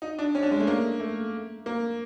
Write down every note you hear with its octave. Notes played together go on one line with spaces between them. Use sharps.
D#4
D4
C#4
D4
G#3
A3
A#3
A3
A#3